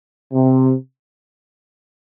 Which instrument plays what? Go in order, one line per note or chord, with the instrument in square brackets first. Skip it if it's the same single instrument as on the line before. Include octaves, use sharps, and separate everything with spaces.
[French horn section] C3